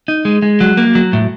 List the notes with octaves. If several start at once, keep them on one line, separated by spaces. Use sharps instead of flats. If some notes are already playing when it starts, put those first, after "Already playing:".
D#4
G#3
G#3
F#3
A#3
F#3
A2